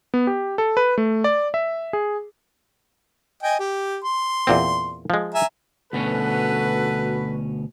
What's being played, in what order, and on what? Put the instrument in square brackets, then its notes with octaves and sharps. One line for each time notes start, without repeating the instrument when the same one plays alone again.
[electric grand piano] B3
G4
A4
B4
A3
D5
E5
G#4
[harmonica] D#5 G5 G#5
G4
C6
[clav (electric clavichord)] E2 A#2 C4
F3 G#3
[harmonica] E5 G#5 A#5
[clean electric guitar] D2 B2 C#4 [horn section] F#4 A4 B4